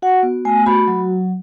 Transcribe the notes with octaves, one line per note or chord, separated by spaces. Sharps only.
F#4 F#5
B3
A3 G#5
F#4 B5
F#3